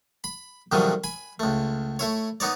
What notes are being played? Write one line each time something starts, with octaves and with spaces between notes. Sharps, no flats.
B5
F2 B2 D#3 E3 F#3 G3
G#5 B5
C#2 A3
A3 E4 C#5
B3 D#4 C#5 D5